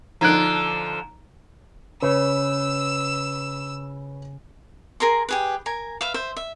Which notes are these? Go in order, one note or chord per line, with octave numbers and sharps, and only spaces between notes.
D3 F3 D#4 A#5 F#6 G#6 D7
C#3 B4 C#5 E6
G#4 A#4 A#5 C6
G4 G#4 B4
A#4 G#5
B4 E5 F5
C5 E5
E5